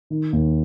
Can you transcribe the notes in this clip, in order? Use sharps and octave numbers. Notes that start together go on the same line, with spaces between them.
D#3
D#2